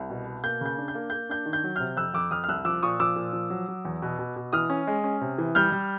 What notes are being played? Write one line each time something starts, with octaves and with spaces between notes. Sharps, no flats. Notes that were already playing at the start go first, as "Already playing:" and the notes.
Already playing: C2
B2
B2
A#3 G6
C#3 G6
D4
G6
A#3
A#3 G6
D4 G6
D#3
G6
F#3
C3 F6 G6
F2 E6 F#6
F2 D6 E6
F2 D#6 F6
F6
C2 E6 F#6
F3 D6 E6
A#2 C#6 D#6
F3 D6 E6
A#2
F3
F#3
F#3
E2
B2
B2
B2
E3 D#6 F6
C#4
G#3
C#4
C3
E3
G3 F6 G6
G3